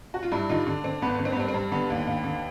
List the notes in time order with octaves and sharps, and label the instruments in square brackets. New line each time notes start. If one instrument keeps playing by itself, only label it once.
[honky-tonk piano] F#4
F4
G2 D4 E4
D3 D#4 F4
D3
D3 C4
G#1 B3
D3
C4
B3
G2 C4
C4
G2
D3 B3
D#2
D#2
D3